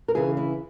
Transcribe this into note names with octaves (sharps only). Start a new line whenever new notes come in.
A#4
C#3 E3 G#4
E4